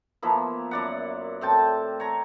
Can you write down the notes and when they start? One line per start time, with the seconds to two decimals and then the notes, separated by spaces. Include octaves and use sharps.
0.22 F3 A#3 B3 E4
0.71 F#2 D5 F#5
1.41 A2 C4 G5 A5
2.00 C#5 A#5